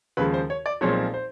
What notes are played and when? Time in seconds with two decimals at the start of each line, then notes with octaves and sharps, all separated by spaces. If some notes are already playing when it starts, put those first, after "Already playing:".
0.17 D#2 C#3 F3 G#3 B4
0.34 C5
0.50 C#5
0.66 D5
0.81 B1 A#2 F3 G#3 C4 C#5
1.14 C5